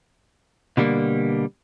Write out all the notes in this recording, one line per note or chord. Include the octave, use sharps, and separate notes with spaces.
B2 D3 G3 A#3